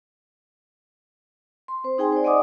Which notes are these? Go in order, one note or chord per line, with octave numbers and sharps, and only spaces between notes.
C6
C4 C5
D#4 G#4 G5 G#5 C6
C5 D5
D5 D#5 F#5 G#5 D6 D#6